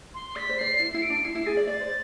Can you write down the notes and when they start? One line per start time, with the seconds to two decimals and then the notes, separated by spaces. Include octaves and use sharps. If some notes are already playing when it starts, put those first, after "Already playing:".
0.14 C6
0.36 D5 B6
0.49 C5
0.58 D5 C7
0.80 E4
0.93 E4 C7
1.02 D7
1.10 D4
1.24 E4 C7
1.35 E4
1.46 G#4 A6
1.57 D5
1.67 D5 A6
1.80 C5